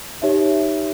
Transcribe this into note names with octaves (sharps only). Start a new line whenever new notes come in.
D#4 G4 C#5 E5